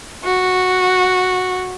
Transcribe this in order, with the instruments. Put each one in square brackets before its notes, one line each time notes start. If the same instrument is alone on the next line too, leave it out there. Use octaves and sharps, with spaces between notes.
[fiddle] F#4